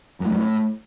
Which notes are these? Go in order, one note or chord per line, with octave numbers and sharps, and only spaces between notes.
F#2
A2
F#2
A2